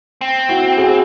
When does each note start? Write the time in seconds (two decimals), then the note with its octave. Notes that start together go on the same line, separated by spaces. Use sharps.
0.21 C4
0.49 E4 F#4
0.77 F#4 G#4